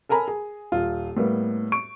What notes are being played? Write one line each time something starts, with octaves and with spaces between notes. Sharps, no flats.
A4 A#4 G#5 A#5 B5
G#4
D#1 F4
A2 G3 A#3 B3
C#6 D7